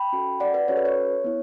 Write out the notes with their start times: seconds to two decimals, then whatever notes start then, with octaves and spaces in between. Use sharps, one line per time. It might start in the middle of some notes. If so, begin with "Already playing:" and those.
Already playing: G5 B5
0.13 C#4 F#4 A4
0.40 D5 F#5
0.54 B4 D5
0.68 C#4 F#4 A4 C#5
0.77 B4
0.85 C#5
1.24 B3 E4